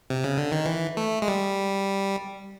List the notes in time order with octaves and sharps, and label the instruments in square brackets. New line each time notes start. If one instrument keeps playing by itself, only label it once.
[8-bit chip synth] C3
C#3
D3
D#3
E3
A3
G#3
G3